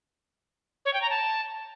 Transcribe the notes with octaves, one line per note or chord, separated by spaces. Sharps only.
C#5
G5
A#5
A5